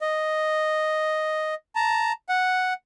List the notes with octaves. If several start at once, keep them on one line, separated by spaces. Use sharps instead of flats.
D#5
A5 A#5
F#5